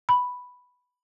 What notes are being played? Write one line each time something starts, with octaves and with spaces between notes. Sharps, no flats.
B5